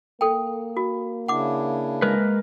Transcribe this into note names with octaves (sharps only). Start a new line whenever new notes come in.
A#3 A4 G5
F#4
C#3 D4 E4 F#5 D6
G#3 A#4 B4